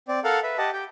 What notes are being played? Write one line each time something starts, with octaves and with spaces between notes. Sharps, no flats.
C4 D5
A4 A#4 F5 F#5
B4 E5
G4 D#5 F#5 A5
G4 G5